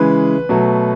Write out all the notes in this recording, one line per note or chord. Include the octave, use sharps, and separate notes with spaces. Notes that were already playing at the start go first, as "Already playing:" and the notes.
Already playing: C#3 E3 G#3 B4
B2 F#3 A3